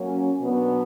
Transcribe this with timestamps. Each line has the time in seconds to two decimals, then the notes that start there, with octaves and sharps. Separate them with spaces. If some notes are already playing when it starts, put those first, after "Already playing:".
Already playing: F#3 A#3 C#4 F#4
0.41 B2 F#3 B3 D4